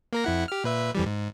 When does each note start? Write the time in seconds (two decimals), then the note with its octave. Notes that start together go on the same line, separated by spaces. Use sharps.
0.13 A#3 A#4 A#6
0.24 F2 E4 F#5
0.48 G4 F6
0.64 A#2 B4 E5
0.95 F2 E3 G3
1.06 G#2